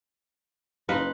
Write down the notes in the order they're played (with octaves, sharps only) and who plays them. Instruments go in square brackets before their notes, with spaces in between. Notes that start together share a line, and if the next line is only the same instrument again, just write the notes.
[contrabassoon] F#1 [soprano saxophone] D#4 [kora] B4 [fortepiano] F5 C6